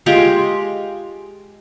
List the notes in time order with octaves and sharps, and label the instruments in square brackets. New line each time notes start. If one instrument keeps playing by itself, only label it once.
[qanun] G#3 F4 G4 A#5